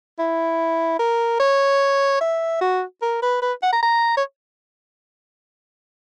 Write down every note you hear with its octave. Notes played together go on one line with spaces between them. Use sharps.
E4
A#4
C#5
E5
F#4
A#4
B4
B4
F#5
A#5
A#5
C#5